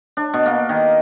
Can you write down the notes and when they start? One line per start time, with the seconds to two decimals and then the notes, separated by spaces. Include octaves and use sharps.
0.17 D4
0.34 B2
0.46 A#3
0.69 D#3